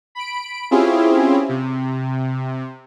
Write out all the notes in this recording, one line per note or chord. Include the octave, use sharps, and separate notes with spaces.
B5 D7
C4 C#4 E4 F4 G4 G#4
C3